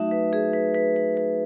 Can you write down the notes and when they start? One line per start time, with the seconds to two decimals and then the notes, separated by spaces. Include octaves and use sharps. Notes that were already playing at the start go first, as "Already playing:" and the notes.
Already playing: F#3 A3 D#4 F#4 E5
0.11 B4
0.33 G#4
0.53 B4
0.75 B4
0.96 B4
1.17 B4